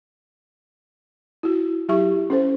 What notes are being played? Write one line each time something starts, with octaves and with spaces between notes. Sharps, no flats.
E4 F#4
F#3 E4 G4 E5 C#6
C#4 A4 C5